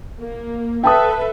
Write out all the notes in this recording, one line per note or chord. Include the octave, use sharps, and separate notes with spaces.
A#3
A4 B4 E5 G5 A5 D#6